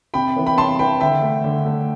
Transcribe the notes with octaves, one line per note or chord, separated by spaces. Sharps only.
C3 G5 B5
E3 B3
G5 B5
C3 A5 C6
E3 B3 G5 B5
D3 E5 G5
A3
D3
A3